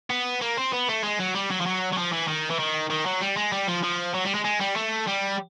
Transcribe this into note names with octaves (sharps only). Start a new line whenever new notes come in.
B3
A#3
C4
B3
A3
G#3
F#3
G3
F#3
F3
F#3
F#3
F3
E3
D#3
E3
D#3
D#3
F#3
G3
G#3
G3
F3
F3
F#3
G3
G#3
G#3
G3
A3
G3